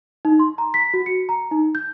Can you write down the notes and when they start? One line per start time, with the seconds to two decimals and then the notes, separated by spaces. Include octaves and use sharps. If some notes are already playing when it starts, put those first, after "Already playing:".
0.25 D#4
0.39 C6
0.58 A#5
0.74 B6
0.94 F#4
1.06 C#7
1.29 A#5
1.51 D#4
1.75 G6